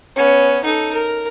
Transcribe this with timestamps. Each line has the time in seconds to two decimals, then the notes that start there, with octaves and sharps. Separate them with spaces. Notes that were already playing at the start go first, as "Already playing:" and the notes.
0.16 B3 C#4
0.64 D#4 A4
0.93 A#4